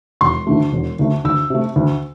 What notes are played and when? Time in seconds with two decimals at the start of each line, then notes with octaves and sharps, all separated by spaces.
0.21 E1 C6
0.47 D2 D3 A3
0.73 E1
0.99 D2 D3 A3
1.25 D2 E6
1.50 C3 A3
1.76 D2